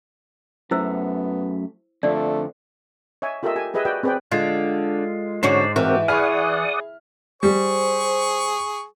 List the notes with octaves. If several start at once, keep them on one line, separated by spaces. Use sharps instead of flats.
F#2 A3 B3 E4 C5 E6
F2 D3 F3 A3 D5
C#5 D#5 E5 G#5
F4 G4 A4 A#4 D#5 E5
G4 G#5
G4 G#4 B4 D#5 E5 G#5
F#4 B4 D5 D#5 G5
C4 G#4 B4 D5 G5
D3 G#3 F4
G#2 D3 C#4 F#4 C5 D5
E3 C4 F#4 G4 A#4
G#4 D5 F#5 G#5 B5 C#6 D#6 F6
G3 G#4 C5 C#6